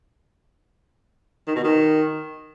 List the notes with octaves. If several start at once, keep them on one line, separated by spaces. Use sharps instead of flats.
D#3
B2
D#3